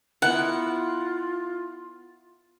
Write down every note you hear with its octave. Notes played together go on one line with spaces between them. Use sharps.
B3 E4 F4 A#4 F#5